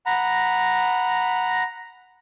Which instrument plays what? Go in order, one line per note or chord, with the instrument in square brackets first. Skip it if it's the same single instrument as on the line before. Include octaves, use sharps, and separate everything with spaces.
[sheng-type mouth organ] F#5 A#5 B5